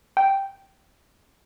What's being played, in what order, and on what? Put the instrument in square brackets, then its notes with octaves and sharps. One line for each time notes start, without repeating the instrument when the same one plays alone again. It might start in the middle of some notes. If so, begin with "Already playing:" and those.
[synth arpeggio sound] G5